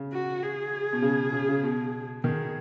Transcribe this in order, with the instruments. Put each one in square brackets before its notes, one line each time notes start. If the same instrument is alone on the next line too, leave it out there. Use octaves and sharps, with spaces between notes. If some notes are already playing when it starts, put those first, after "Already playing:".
Already playing: [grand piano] C#3
[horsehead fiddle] F#4
G#4
[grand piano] B2
C#3
C#3
C#3
B2
[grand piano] D#3 [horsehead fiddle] G#4